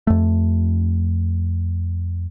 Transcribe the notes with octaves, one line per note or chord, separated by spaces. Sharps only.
F2 A3